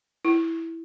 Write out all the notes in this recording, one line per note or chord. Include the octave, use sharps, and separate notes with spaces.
E4